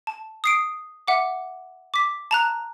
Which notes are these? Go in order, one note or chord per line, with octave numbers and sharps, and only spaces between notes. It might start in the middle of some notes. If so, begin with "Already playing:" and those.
A5
D#6 C7 D7
E5 F#5 D6
D6 B6
A5 A#5 F#6